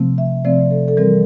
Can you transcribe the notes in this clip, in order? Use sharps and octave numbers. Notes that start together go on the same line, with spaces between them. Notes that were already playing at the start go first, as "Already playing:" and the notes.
Already playing: C3 F3 A3 C4
E5
C3 F3 A3 C4 D5
A4
A4
E3 G3 C4 A#4